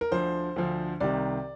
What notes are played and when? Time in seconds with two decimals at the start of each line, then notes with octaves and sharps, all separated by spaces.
0.01 A#4
0.11 D2 D3 F3 C5
0.56 D2 D3 F3
1.00 C2 C3 D#3 D5